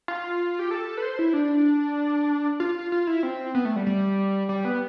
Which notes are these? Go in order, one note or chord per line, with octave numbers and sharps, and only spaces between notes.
F4
G4
A4
B4
C5
E4
D4
F4
F4
E4
C4
B3
A3
G3
G3
G3
B3